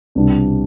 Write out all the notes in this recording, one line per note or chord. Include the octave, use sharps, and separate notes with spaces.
C2 B2 G3 B3 D4